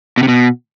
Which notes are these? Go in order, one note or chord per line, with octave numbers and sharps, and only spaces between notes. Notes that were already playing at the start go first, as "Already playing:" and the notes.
B2
C3
B2